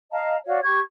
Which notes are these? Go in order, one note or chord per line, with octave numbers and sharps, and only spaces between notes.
D#5 F5 A5 A#5
F#4 C#5 D5 F5
G4 C#6 G#6